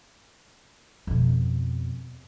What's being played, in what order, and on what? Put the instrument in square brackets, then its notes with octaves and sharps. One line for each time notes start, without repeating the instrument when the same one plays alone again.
[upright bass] F2 B2